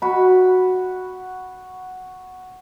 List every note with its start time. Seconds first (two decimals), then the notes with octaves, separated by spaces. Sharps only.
0.02 F#4 B5